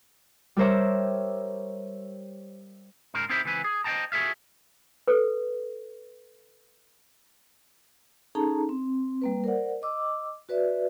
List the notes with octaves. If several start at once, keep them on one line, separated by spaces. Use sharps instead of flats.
G3 G4 A#4 C5 C#5 E5
G#2 C#3 A#4 C5
C4 D#4 E4 A#4 C5 E5
C#2 E3 C4 B4 G#5
G#4
C5 D#5 F#5 G5 A5 A#5
F#4 G#4 A4 E5 F5
A4 B4
C#4 D#4 G#4 A4 A5 A#5
C4
G3 A#3 B4
A#4 C5 D5 F#5
D#5 D6 E6
F#4 B4 D5 E5